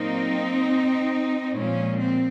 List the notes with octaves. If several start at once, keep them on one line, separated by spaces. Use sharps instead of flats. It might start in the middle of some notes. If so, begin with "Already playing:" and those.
Already playing: A#2 F#3 A#3 C4 D#4
A#2 F3 G#3 C#4
C4